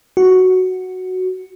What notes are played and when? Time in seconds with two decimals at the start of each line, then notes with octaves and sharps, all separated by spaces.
0.17 F#4